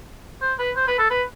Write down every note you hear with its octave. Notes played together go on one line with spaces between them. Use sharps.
C5
B4
C5
B4
A4
B4